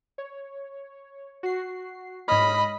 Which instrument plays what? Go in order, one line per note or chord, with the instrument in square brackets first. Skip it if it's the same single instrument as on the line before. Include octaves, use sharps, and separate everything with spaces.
[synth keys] C#5
F#4 C7
[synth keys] G#2 C#5 F6 [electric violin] D#5 B5